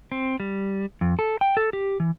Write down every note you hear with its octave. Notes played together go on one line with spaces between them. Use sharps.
C4
G3
F2
A4
G5
A4
G4
E3